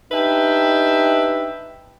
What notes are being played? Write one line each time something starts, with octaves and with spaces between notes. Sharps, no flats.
D4 D#4 G4 B4 E5 G5